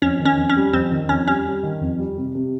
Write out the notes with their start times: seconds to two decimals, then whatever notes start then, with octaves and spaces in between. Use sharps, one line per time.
0.02 F2 C#4
0.19 D#3
0.25 C#4
0.37 F2
0.50 C#4
0.56 G3
0.73 F2 C4
0.91 D#3
1.09 F2 C#4
1.28 G3 C#4
1.46 G3
1.63 D#3
1.81 F2
1.99 G3
2.18 C3
2.35 C3